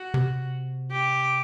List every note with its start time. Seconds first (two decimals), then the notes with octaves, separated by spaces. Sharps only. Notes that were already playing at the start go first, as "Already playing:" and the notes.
Already playing: F#4
0.14 C3
0.92 G4